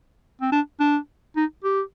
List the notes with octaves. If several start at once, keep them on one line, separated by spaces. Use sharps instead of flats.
C4
D4
D4
D#4
G4